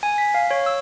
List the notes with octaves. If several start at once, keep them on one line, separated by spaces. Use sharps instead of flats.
G#5
B6
F5
C#5
E6